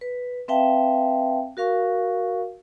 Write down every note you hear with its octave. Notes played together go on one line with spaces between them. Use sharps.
B4
C4 B4 E5 F5 G5 A5
F#4 A#4 F5 C#6